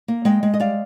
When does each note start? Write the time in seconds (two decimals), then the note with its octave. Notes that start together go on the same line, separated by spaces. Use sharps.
0.08 A#3
0.25 G#3 D#5 G5
0.43 G#3
0.54 D#5
0.60 G3 D5 F5